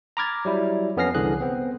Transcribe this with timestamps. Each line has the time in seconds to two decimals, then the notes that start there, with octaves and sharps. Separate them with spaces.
0.17 A#5 B5 D6 F6 G#6 A6
0.45 F#3 G3 E4
0.97 F2 B3 C#4 F6 A#6 C7
1.15 C2 D3 E3 G#4 F#6
1.40 B3 C4